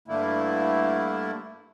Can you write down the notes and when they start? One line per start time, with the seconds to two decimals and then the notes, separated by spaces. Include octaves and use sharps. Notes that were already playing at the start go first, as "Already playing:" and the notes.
0.08 G2 D3 A3 A#3 E4